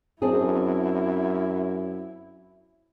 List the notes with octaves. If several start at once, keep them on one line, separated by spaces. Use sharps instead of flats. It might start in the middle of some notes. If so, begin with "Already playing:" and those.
F#2 C4 D4 E4 G#4